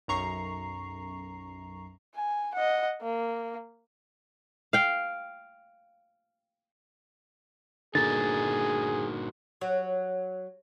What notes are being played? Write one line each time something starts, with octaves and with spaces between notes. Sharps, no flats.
B1 F#2 A#5 C#6 C7
G#5
D#5 F#5
A#3
F5 G5
G1 A#2 D3 D#4 F#4 G#4 A#4 A6
F#3